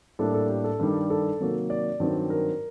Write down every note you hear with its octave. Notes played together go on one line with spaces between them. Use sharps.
A2 G3 A#3 D4 A4
A4
G4
A4
G2 D#3 G3
A4
C3 D#3 F#3 A#3
D5
G2 D#3 F#3 C4
A#4